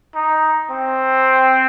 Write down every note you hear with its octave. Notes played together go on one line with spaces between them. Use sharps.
D#4
C4